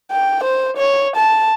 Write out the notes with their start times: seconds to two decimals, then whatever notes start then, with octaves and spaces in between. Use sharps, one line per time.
0.11 G5
0.44 C5
0.77 C#5
1.16 A5